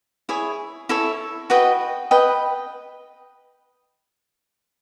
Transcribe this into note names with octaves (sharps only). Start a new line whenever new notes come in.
E4 G#4 C#5
E4 A4 C#5
F#4 B4 D#5 G5
B4 D#5 G5